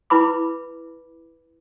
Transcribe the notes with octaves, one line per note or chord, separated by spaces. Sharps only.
E4 B4 B5 D6